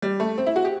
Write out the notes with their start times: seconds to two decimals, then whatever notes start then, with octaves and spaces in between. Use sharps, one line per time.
0.02 G3
0.20 A3
0.38 C4
0.46 E4
0.56 F#4
0.65 G4